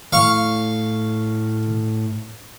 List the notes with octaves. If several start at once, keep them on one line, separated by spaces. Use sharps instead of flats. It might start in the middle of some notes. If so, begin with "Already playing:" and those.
A2 F5 C#6